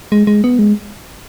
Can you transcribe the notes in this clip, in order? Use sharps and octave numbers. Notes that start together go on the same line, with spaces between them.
G#3
G#3
B3
G#3